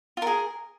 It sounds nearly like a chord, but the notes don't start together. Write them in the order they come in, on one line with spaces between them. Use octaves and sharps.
F4 A#4 G#4